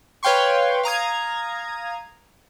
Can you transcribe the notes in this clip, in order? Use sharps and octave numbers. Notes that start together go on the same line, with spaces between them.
B4 C#5 F5 G5 C6 C#6
F5 A#5 D#6 G#6